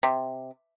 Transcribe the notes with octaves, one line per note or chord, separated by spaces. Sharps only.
C3